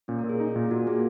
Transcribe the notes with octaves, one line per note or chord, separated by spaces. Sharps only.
A#2 C#4
A#4
A#2
G#4
D#4
A#2
A#2 F#4
A#3 G#4